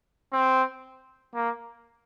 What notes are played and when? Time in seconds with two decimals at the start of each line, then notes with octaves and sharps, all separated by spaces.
0.32 C4
1.34 A#3